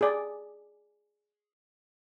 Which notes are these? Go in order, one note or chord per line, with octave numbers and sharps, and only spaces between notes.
G#4 D5